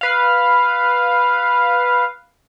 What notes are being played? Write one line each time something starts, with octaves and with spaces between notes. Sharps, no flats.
B4 F5